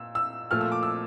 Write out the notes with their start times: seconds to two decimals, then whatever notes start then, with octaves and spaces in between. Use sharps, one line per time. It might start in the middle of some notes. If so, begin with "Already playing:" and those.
Already playing: A#2 E6
0.15 E6
0.51 A#2 F3 A3 F6
0.61 E6
0.72 D6
0.83 E6